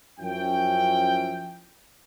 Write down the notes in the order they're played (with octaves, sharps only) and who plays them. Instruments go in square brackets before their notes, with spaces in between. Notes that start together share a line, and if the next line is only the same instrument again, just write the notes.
[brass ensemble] F#2 F3 C#4 E4 G5